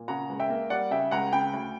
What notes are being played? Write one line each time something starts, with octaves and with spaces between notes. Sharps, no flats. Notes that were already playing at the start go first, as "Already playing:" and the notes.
Already playing: A#2
C#3 F#5 A#5
C#2
E5 G5
A#3
G3 D5 F#5
C#3 E5 G5
C#2 F#5 A#5
C#3 G5 B5
D2